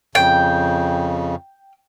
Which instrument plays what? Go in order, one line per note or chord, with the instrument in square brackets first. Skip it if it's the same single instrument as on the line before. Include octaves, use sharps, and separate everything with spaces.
[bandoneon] F2 C#3 [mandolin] G5